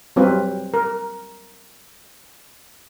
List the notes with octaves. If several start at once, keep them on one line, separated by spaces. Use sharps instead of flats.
F#3 G3 C4 F4 B4
A#4